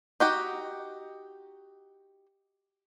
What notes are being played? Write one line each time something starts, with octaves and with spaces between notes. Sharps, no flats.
D#4 F#4 G4